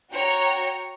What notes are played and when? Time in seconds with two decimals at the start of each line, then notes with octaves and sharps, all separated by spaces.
0.11 F#4 C#5 G5 A#5 C#7